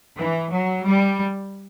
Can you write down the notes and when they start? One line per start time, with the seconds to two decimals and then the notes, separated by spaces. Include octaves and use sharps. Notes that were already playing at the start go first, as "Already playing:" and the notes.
0.16 E3
0.51 F#3
0.85 G3